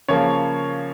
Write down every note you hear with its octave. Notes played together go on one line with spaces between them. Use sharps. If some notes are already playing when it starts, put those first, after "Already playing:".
C#3 F3 A#3 C#5